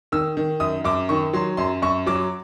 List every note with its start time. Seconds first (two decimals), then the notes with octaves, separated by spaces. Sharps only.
0.12 D#3 E6
0.37 D#3
0.60 F#2 D#6
0.84 F#2 D6
1.09 D#3 C#6
1.33 F#3 C6
1.57 F#2 C6
1.82 F#2 C#6
2.06 F#3 D6